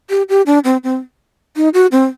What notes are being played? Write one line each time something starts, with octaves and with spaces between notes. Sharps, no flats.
G4
G4
D4
C4
C4
D#4
F#4
C4